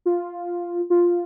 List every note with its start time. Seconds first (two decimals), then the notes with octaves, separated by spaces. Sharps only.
0.06 F4
0.90 F4